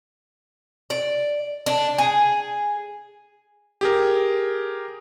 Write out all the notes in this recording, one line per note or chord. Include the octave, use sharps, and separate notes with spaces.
D5
D4
G#4
G4 G#4 A#4